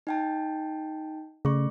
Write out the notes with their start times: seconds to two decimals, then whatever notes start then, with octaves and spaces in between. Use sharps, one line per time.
0.07 D#4 G5 A5
1.45 C#3 A3 C#6